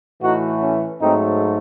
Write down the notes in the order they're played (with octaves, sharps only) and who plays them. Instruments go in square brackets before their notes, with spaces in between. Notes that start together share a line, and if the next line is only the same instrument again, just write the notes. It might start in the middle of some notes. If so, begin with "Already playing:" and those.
[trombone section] A2 E3 A3 D#4 F#4
C#4
G#2 F#3 A3 C4 D#4